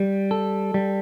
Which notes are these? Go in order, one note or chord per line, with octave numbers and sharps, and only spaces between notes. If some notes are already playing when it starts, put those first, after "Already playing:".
Already playing: G3
A4
G3